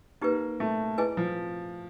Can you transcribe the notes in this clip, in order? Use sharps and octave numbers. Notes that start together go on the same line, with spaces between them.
A#3 D#4 G4 B4
A3
E4 G#4 B4 D#5 G#5
F3